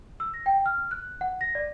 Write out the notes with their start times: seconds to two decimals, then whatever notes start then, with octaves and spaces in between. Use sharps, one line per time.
0.20 E6
0.34 A#6
0.46 G5
0.66 F6
0.91 F#6
1.21 F#5
1.41 A#6
1.55 D5